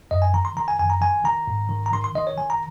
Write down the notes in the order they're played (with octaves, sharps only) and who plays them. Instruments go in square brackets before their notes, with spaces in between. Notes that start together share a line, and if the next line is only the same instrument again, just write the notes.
[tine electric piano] F#2 D#5
G#5
D#3 A#5
C6
D#3 A#5
G#5
F#2 G#5
A#5
D#3 G#5
D#3 A#5
G#2
D#3
A#5
D#3 C6
C6
D#3 D#5
C#5
D#3 G#5
A#5